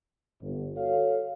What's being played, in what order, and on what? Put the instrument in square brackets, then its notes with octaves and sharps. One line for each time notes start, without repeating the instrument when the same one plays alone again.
[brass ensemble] G1
F#4 A4 C#5 F5